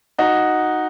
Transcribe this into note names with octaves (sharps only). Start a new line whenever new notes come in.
D#4 F#4